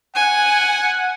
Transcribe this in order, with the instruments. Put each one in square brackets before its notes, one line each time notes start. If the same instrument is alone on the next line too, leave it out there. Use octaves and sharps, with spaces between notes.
[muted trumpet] F#5 [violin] G#5